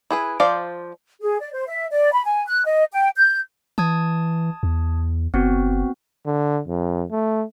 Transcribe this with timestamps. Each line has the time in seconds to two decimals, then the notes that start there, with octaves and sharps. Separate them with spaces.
0.11 E4 G#4 B4
0.40 F3 C5 D5 F5
1.21 G#4
1.40 D5
1.53 C5
1.67 E5
1.91 D5
2.13 B5
2.24 G#5
2.48 F#6
2.65 D#5
2.92 G5
3.16 G6
3.78 E3 A5 D#6 G#6
4.63 E2
5.34 F#1 B3 C4 F#4
6.26 D3
6.68 F2
7.11 A3